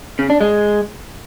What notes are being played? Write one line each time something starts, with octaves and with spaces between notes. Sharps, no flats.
C#3
D4
G#3